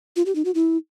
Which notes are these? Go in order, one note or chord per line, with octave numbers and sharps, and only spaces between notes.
F4
G4
D#4
F#4
E4